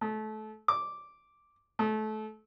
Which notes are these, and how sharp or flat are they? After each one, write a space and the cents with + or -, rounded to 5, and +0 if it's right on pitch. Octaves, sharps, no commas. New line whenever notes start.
A3 -25
D6 -5
A3 -25